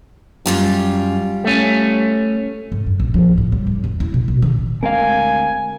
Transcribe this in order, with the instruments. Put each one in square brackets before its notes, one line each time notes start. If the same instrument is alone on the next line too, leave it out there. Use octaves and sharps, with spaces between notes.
[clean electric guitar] F#2 [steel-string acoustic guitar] G3 F4 G4
[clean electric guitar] A3 C#4
[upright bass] G#2
F#2
A#1
F3
A2
G3
A2
E2
E4
B2
A#1
D#3
[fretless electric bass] D2 G#3 C4 [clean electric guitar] A#4 F5 [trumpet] G#5